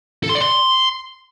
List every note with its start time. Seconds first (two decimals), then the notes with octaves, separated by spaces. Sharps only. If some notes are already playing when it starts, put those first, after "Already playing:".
0.24 A4
0.29 C6
0.35 D5
0.41 C6